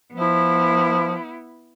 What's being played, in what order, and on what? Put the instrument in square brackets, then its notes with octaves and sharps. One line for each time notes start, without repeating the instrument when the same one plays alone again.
[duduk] F3 [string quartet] B3 E4